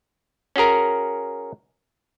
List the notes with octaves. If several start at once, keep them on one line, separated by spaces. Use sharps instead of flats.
C#4 F#4 G#4 A#4